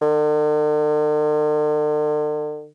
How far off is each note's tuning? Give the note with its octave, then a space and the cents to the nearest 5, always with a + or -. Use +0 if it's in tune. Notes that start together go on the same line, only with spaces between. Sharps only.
D3 +45